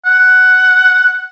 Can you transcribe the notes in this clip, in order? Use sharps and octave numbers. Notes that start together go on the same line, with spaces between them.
F#5